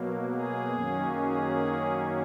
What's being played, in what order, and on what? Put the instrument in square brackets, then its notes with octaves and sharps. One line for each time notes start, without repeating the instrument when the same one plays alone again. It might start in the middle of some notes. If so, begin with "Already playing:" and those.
Already playing: [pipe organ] B2 F#3 A#3
G#4
F#2 D#3 F#3 A#3 C#4
G#4